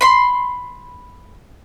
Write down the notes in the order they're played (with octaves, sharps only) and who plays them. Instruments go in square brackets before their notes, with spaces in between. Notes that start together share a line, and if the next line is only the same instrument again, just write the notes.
[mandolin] B5 C6